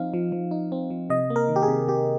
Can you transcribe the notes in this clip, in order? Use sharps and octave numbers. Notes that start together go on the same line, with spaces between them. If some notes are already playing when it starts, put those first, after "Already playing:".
Already playing: F3 C4 D#4 F5
F3
F3
D#4
C4
F3
C3 D#5
A#3
A#4
D#3
G4
G#4
C3
C3 G4